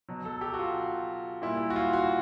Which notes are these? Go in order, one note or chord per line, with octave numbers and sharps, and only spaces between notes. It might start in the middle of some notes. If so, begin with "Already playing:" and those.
B2 F#3
A4
G4
F#4
F4
A#2 G3 E4
F#4
F4
F#4